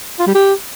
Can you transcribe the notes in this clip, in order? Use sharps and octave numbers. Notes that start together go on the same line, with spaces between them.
F4
G3
G4